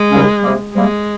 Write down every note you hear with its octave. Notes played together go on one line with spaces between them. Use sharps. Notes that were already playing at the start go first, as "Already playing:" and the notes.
Already playing: G#3
D#2 C#3 G3 C#4
C3 G3 A#3
C3 G3 G#3 A#3